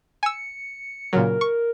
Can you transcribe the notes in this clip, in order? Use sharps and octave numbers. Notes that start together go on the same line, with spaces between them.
G#5 E6 C#7
A#2 C#3 F#3 A#4
C#6